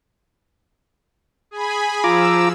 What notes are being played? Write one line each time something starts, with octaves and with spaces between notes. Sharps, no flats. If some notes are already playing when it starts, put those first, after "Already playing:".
G#4 G#5 B5
F3 F4 A#5 D6 E6